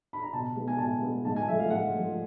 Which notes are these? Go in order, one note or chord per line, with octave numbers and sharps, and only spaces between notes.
B5
A#5
B2 A5
G#3 B3
G#5
B2 A5
G#3 B3
G#2 A5
G#5
F3 A3 E5
F5
G#2 F#5
F3 A3